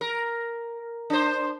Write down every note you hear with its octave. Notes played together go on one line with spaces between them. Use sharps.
A#4
D4 C5